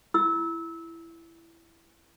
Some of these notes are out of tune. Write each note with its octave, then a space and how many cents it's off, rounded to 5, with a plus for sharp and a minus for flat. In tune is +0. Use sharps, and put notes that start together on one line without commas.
E4 +15 E6 -25